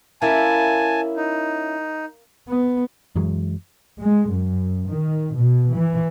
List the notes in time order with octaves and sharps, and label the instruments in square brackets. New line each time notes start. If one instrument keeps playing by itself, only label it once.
[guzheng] A#3 E5 [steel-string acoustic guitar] C#4 E4 [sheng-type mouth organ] G#5 A5
[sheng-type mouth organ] D#4
[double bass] B3
[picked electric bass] F#2 E3 F#3 G#3
[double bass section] G#3
F#2
D#3
B2
E3